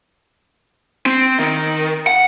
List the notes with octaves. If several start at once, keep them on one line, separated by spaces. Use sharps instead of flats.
C4
D#3
F#5